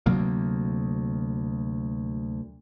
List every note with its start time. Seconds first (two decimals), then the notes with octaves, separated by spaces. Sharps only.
0.06 D2 C3 F#3 A#3